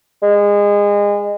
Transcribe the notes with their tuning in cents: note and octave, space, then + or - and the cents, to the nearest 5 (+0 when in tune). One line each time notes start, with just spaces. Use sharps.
G#3 -25